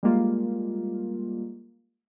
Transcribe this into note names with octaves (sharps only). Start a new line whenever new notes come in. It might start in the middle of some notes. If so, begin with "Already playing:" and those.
G3 G#3 A#3 F4